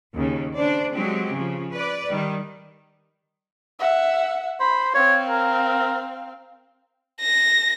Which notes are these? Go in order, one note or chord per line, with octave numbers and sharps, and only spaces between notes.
D#2 C#3
C#3 D4 C5 D5
F#3 G#3 C4 G4
C#3 F3
B4 D5
D#3 G3
E5 F#5
C5 B5
C4 C#5 F5
A#4
A#6